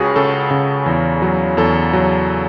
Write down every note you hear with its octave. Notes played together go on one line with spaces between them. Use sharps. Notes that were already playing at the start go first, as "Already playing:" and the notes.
Already playing: C#2 C#3 F#4 G#4
C#3 A4
C#3
E2
F#3
E2 A4
F#3